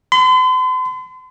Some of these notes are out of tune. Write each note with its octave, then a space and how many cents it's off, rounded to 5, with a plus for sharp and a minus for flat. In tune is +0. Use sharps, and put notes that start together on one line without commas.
C6 -45